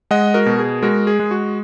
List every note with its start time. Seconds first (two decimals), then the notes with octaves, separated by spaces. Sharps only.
0.11 G#3 D#5 F#5
0.34 F#4 A#4
0.46 B2
0.59 G#4
0.83 G#3 F#4 A#4
1.07 G#4
1.20 G#3
1.31 F#4